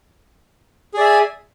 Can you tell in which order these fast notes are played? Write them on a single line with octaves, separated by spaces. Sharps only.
G#4 D5 E5 G#5